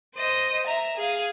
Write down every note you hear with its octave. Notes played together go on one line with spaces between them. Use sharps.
C5 D#5
E5 A#5
G#4 F5